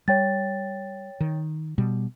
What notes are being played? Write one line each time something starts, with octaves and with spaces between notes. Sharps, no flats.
G3 C#5 G5 A6
D#3
B2 G3